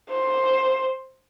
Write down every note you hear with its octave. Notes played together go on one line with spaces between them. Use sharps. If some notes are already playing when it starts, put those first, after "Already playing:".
C5